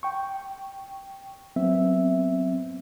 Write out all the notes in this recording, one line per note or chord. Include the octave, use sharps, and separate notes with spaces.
G5 C#6
F#3 B3 C4 E5